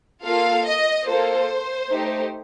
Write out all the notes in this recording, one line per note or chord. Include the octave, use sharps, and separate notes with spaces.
A#3 F4 A4 F5
D#5
A#3 F4 A4 C5
A3 D#4 G4